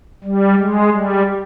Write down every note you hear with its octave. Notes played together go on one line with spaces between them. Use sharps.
G3
G#3
G3